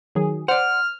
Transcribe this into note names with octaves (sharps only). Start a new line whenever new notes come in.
D#3 F#3 G#4
C5 D5 F#5 F6